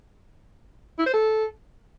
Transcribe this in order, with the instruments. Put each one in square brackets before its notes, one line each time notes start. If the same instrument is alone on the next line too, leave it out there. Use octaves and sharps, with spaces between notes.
[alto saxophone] E4
C5
A4